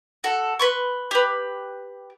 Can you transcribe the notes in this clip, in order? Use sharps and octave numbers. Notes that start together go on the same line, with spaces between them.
F#4 A4
B4 C6 C#6
G4 B4